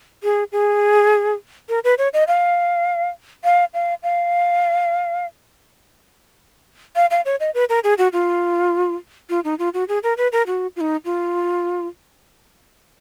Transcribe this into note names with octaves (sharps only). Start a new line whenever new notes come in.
G#4
G#4
A#4
B4
C#5
D#5
F5
F5
F5
F5
F5
F5
C#5
D#5
B4
A#4
G#4
F#4
F4
F4
D#4
F4
F#4
G#4
A#4
B4
A#4
F#4
F4
D#4
F4